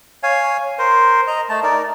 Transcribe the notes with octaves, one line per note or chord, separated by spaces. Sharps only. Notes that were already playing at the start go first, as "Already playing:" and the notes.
C#5 F5 G#5
A#4 C5
D#5 A#5
A3 A5
D#4 A#4 D5